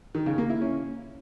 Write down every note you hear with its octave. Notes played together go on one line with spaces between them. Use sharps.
D#3
C#3
A#3
E4
C#4